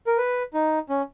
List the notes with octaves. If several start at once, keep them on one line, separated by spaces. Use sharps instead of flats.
A#4
B4
D#4
C#4